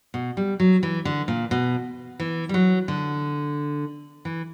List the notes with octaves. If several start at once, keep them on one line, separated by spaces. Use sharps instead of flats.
B2
G3
F#3
E3
D3
A#2
B2
E3
G3
F#3
D3
E3